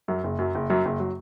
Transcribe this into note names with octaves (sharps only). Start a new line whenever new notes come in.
F#2 F#3
F#1
F#2 F#3
F#1
F#2 F#3
F#1
F#3